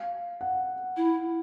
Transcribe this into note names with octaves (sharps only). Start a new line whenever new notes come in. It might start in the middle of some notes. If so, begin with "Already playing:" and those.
Already playing: F5
F#5
E4